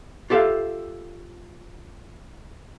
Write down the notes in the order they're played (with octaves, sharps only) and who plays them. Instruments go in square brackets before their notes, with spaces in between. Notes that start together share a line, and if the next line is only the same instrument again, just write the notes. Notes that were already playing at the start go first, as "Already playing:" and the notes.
[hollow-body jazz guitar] F4 G4 A4 E5 F5